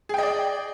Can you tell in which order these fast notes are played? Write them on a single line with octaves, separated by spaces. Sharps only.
G#4 G5 D#5 D5